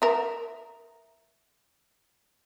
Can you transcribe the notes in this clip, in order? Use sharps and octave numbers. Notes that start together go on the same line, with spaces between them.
A#4 E5